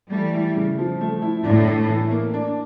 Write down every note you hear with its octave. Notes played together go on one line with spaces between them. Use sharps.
E3 G3 A3
E4
C#3
F3
A3
E4
A2 D4
A4
E3
A#3
D4